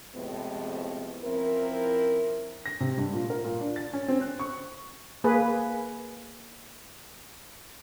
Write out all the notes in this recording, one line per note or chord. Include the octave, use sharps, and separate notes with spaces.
F2 A2 C3 G#3 B3
F3 C4 C#4 E4 A#4
A#6
C3
G2
A#2
A#4
A#2
D4
A6
C#4
C4
F#6
C#6
A#3 G#4 B4